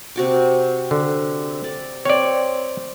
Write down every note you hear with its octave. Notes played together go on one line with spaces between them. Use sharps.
C3 F#4 D6
D3
D5
C4 C#5 D5